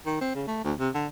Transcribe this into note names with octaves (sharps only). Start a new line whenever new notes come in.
D#3
C4
C#3
A3
D2
C3
D3